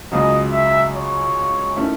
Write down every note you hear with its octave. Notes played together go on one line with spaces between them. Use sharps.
C#2 C#3 F#3 D#5
E5
C#5
D#3 A3 C#4 E4